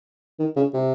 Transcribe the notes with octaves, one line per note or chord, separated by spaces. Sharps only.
D#3
C#3
C3